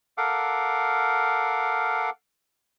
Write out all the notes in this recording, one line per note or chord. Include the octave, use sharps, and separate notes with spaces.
A4 A#4 F5 F#5 D6